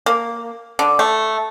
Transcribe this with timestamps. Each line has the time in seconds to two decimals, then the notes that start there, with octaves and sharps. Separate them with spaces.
0.06 A#3
0.79 D3
0.99 A3